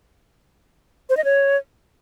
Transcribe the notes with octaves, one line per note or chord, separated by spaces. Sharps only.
C5
D#5
C#5